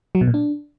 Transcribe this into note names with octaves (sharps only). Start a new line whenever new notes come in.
F#3
B2
A#2
D4